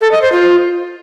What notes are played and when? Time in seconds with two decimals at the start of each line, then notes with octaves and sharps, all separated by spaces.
0.01 A4
0.11 D#5
0.22 C5
0.32 F4